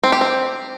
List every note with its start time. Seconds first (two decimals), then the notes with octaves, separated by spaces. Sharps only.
0.04 C4
0.12 G4
0.21 C4